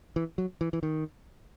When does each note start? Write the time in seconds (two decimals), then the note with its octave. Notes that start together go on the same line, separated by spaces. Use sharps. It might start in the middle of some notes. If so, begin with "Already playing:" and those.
0.16 E3
0.38 F#3
0.61 E3
0.73 E3
0.83 D#3